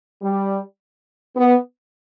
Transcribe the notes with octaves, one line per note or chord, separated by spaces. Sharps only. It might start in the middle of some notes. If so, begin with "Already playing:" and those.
G3
B3